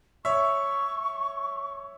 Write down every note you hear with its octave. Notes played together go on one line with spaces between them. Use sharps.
C#5 E5 C#6